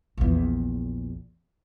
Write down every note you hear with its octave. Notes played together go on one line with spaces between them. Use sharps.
A#1 E2